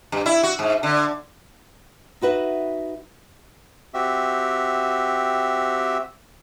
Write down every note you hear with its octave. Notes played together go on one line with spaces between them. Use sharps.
G2
E4
F#4
G#2
D3
D#4 F#4 B4 E5
C4 F#4 G4 E5